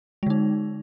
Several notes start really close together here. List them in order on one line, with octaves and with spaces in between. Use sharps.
G#3 D3 D#4